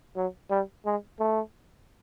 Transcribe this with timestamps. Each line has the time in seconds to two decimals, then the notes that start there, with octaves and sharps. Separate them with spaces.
0.16 F#3
0.50 G3
0.86 G#3
1.20 A3